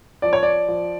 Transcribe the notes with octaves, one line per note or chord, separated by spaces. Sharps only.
F3 D5
C#5
D5
F3